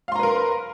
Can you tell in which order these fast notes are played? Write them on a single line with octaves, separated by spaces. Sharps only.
F5 C6 A#5 B4 A#4